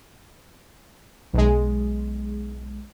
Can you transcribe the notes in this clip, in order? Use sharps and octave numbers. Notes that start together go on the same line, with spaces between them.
B1 G#3